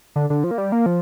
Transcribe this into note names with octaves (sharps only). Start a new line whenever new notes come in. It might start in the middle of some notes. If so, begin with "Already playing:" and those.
D3
D3
F3
A#3
G3
A#3
F3